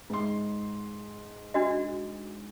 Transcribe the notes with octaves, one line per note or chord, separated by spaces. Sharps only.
G#2 C6
D4 F#4 D#5